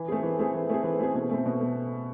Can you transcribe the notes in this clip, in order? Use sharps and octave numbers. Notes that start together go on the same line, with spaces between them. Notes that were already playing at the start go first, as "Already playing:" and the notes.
Already playing: E3
A3 C4 G#4
E3
A3 C4 G#4
E3
A3 C4 G#4
E3
A3 C4 G#4
B2
A3 C4
B2
A3